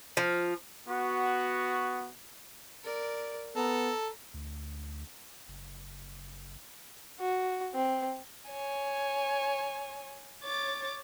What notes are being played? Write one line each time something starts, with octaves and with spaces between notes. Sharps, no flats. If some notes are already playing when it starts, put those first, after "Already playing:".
F3
B3 F#4
A#4 D5
B3 A4 A#5
D2
F#1
F#4
C4
C#5 G#5
C#5 D6 A6